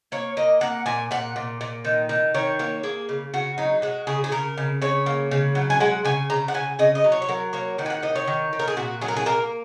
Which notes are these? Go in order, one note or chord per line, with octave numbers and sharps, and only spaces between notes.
A#3 C#5
A#3 D#5
A#3 F#5
A#2 G#5
A#2 F#5
A#2
A#2
D#3
D#3
D#3 C#5
A#3 C#5
A#3 G#4
C#3
C#3 F#4
F#3 D#4
G#3 F#4
C#3 G#4
G#4
C#3 A#4
C#3
C#3 C#5
A#3
C#3
F#3
G#5
G#3 F#5
C#3 G#5
C#3 A#5
F#5
C#3 G#5
C#3 D#5
D#5
F#3
C#5
C#5
F#3 A#4
A#3 C#5
D#3 F#5
G#5
F#5
D#3 D#5
C#5
D#3
D#3
A#4
G#4
A#2 F#4
F#3 G#4
A#4
G#4
A#3 A#4